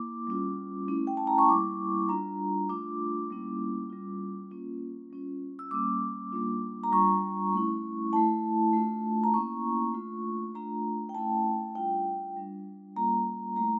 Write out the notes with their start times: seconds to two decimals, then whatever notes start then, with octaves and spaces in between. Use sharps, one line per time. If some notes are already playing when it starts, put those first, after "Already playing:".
Already playing: A#3 E4 D6
0.27 G3 C#4 F4
0.88 A3 C#4 E4
1.07 G5
1.17 A5
1.27 A#5
1.38 C#6
1.48 G3 A#3 E4 D6
2.08 G3 D4 F4 A#5
2.69 A3 D4 F4 D6
3.30 G3 A#3 C#4 E4
3.90 G3 C#4 F4
4.51 A#3 C#4 F4
5.10 G3 C#4 F4
5.59 E6
5.71 G3 A#3 C#4 D6
6.32 G3 A#3 D4 F4
6.84 A#5
6.92 G3 D4 F4 C#6
7.53 A3 C#4 E4
8.13 A3 E4 A5
8.73 A3 D4 F4
9.24 A#5
9.34 A#3 C#4 E4 C#6
9.94 A3 D4 F4
10.55 A3 D4 F4 A#5
11.09 G5
11.15 A3 C#4 E4 A5
11.75 G3 D4 F4 G5
12.37 G3 D4 F4
12.96 G3 A#3 C#4 F4 A#5
13.56 A3 E4 A#5